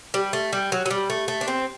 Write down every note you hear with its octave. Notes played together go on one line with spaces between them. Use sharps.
G3
A3
G3
F#3
F#3
G3
A3
A3
D4
C4